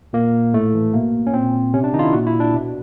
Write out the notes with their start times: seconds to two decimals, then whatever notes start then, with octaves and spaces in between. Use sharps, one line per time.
0.13 A#2 A#3
0.54 A2 A3
0.74 E3
0.93 B2 A#3
1.27 C#4
1.33 A#2 C4
1.74 C3 C#4
1.84 D4
1.94 D#3 D#4
1.99 F4
2.03 E4
2.13 A#2 F#4
2.27 E4
2.40 D4
2.54 B2